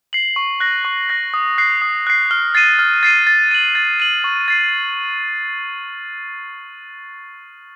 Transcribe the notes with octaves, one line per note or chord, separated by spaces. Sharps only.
C7 F#7
C#6
F#6 A#6
C#6
F#6 A#6
D#6
F#6 C7
D#6
F#6 C7
F6
A6 C7 D#7
F6
A6 C7 D#7
A6
D#7 F#7
A6
D#7 F#7
C#6
A6 C7